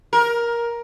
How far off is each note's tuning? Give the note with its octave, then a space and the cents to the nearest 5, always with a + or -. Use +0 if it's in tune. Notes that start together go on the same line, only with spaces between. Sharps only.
A#4 +15